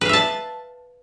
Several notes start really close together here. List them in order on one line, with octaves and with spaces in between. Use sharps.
B4 F5 E5 A5